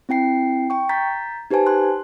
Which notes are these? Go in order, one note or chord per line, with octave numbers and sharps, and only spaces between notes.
C4 E4 G5 C7
G5 C#6
A#5 G6 A6 B6
D#4 G4 B4 C5 G#5 A5
C6 F#6